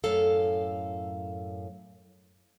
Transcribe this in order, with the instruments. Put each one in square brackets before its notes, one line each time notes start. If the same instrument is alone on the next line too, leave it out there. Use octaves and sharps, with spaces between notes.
[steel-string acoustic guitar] F#2 A2 A4 F5